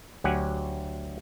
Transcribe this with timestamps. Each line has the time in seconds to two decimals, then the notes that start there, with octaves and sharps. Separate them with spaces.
0.24 D2 F#3 G4 F#5 G#5